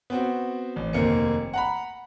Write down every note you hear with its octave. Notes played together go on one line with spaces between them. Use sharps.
B3 C4 F#4
A1
F1 D#2 A#3 C4 C#7
F#5 A#5 B5